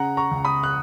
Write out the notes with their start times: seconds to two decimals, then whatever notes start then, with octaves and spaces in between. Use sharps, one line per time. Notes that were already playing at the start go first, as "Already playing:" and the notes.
Already playing: C#3 F#5 A#5
0.17 A#5 C#6
0.31 C#2
0.45 B5 D#6
0.63 F#6